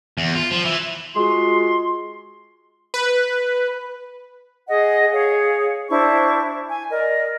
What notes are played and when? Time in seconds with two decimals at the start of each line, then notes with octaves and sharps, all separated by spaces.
0.18 E2
0.35 F4
0.51 F3
0.65 E3
1.15 G#3 F4 F#4 C6
2.94 B4
4.68 G#4 D#5 F#5
5.12 G#4 C#5 F5
5.88 D4 E4 C5 C#6
6.69 G#5
6.90 A#4 D5 D#5